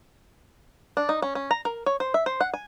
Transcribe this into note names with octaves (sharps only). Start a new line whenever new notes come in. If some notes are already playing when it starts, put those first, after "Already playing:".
D4
D#4
C#4
C#4
A#5
A#4
C#5
C5
E5
C5
F#5
G#5